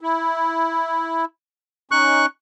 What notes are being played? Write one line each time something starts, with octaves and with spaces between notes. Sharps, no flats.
E4
C#4 D#4 C#6 F#6